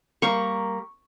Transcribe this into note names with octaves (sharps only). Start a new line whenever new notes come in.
G3 A#3 A#4 C#6